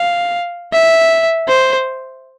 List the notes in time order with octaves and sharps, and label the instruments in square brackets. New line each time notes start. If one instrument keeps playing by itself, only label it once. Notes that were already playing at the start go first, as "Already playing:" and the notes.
Already playing: [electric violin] F5
E5
C5